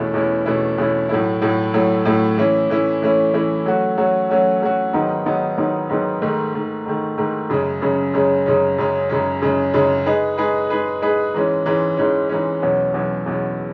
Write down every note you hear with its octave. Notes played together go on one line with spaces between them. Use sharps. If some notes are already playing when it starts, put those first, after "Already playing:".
Already playing: E2 B2 A3 C#4 E4
E2 B2 A3 C#4 E4
E2 B2 A3 C#4 E4
E2 B2 A3 C#4 E4
A2 F#3 A3 E4
A2 F#3 A3 E4
A2 F#3 A3 E4
A2 F#3 A3 E4
E3 A3 C#4 E4
E3 A3 C#4 E4
E3 A3 C#4 E4
E3 A3 C#4 E4
F#3 A3 C#4 F#4
F#3 A3 C#4 F#4
F#3 A3 C#4 F#4
F#3 A3 C#4 F#4
G#2 D#3 F#3 B3 D#4
G#2 D#3 F#3 B3 D#4
G#2 D#3 F#3 B3 D#4
G#2 D#3 F#3 B3 D#4
G#2 D#3 A3
G#2 D#3 A3
G#2 D#3 A3
G#2 D#3 A3
F#2 C#3 G#3 C#4
F#2 C#3 G#3 C#4
F#2 C#3 G#3 C#4
F#2 C#3 G#3 C#4
F#2 C#3 G#3 C#4
F#2 C#3 G#3 C#4
F#2 C#3 G#3 C#4
F#2 C#3 G#3 C#4
G#3 D#4 G#4 B4
G#3 D#4 G#4 B4
G#3 D#4 G#4 B4
G#3 D#4 G#4 B4
G#2 E3 G#3 C#4
G#2 E3 G#3 C#4
G#2 E3 G#3 C#4
G#2 E3 G#3 C#4
E2 B2 F#3 C#4
E2 B2 F#3 C#4
E2 B2 F#3 C#4